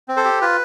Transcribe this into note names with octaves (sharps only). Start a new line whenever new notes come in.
C4
A4 C5
G4
F4 B4